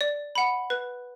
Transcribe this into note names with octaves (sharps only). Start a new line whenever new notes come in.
D5
F#5 B5
B4